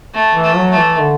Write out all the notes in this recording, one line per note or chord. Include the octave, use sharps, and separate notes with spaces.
A3
E3
A3
F#3
A3
E3
D3